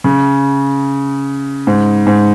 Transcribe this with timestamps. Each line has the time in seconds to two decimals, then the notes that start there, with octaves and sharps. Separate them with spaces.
0.04 C#3
1.67 G#2
2.07 G#2